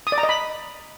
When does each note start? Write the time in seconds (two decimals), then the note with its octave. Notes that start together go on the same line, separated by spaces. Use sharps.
0.07 D#6
0.12 D5
0.18 A#5
0.23 D#5
0.29 B5